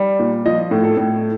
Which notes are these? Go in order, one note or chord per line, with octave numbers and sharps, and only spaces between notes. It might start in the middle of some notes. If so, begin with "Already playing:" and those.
Already playing: G3
A#2
F3 D#5
A2
A4
A2